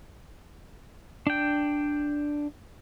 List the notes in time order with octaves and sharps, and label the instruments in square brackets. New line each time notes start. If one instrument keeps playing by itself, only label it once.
[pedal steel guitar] D4 G5